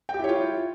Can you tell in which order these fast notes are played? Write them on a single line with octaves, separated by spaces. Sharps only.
G5 G4 E4 C#5 F4